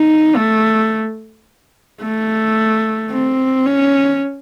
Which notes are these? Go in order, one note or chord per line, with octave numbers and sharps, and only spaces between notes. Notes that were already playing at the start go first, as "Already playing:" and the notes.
Already playing: D#4
A3
A3
C4
C#4